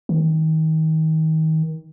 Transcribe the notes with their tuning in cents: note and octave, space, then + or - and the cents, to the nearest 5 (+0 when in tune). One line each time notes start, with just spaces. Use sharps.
D#3 +30